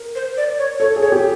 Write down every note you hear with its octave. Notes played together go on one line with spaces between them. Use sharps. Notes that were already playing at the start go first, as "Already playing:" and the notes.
Already playing: A#4
C5
D5
C#5
A4 C#5
G#4
C#5
G4